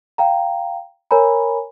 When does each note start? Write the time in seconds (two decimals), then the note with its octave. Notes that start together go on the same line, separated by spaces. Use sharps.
0.18 F5 G5 A#5
1.11 A#4 C#5 G#5 A#5 B5